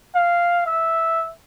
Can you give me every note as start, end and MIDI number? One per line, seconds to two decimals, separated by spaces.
0.15 0.65 77
0.66 1.29 76